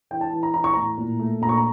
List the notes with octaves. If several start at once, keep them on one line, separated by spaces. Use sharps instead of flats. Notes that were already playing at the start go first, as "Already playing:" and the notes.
E3 G5
A5
E3
A#5
E3 A#5
C#6
A2 A#5
A#2
A3
A#2 A#5
C#6
A#5